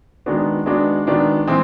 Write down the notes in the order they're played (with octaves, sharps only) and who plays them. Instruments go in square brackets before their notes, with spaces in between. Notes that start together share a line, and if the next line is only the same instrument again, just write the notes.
[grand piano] D#3 G#3 B3 D4 F#4
D#3 G#3 B3 D4 F#4
D#3 G#3 B3 D4 F#4
E3 G#3 C4